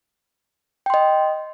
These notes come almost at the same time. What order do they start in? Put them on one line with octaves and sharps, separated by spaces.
G5 C6 D#5